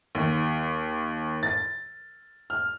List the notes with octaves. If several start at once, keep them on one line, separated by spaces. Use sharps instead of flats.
D#2
A6
F6